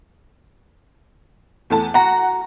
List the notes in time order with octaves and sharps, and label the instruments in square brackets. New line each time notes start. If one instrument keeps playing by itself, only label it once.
[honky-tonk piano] E2 A3 A5
[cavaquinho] F#4 A#5 [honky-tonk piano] F#5